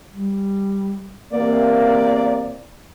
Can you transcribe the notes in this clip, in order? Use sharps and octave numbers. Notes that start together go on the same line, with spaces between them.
G3
E2 C3 A#3 D5